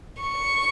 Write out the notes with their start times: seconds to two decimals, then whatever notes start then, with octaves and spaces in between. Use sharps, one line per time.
0.22 C#6